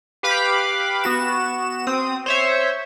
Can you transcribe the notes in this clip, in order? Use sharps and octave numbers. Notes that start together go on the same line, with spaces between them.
G4 B4 F5 B5 D6
B3 F#4 E7
C4 D#6
C5 C#5 E5